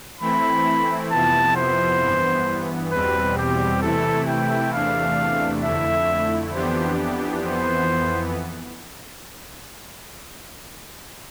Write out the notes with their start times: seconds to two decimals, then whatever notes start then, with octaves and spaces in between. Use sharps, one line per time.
0.20 E3 A3 C4 E4 B5
1.11 F2 C3 F3 B3 E4 A5
1.56 C5
2.02 G2 E3 B3
2.92 E2 B2 G3 C4 B4
3.37 G4
3.82 C3 E3 A3 E4 A4
4.28 G5
4.73 E2 C3 E3 A3 D4 F5
5.63 F2 D3 A3 E4 E5
6.53 F2 E3 B3 D4 G4 C5
7.44 F2 E3 B3 C5